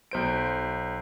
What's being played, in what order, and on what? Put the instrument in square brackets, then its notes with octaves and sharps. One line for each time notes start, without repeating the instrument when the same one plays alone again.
[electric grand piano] B1 C5 D7